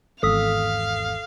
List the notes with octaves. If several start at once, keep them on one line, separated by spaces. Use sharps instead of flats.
G#1 E2 A4 F5 D#6 B6